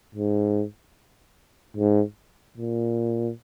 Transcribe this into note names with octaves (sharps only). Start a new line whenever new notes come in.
G#2
G#2
A#2